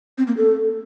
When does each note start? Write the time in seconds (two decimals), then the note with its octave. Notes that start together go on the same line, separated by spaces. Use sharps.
0.18 C4
0.27 A#3
0.37 A4